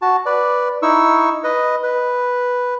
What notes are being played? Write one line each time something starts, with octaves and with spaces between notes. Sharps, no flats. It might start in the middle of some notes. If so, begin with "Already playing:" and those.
F#4 A5
B4 D5
D#4 E4 C#6 E6
B4 D#5
B4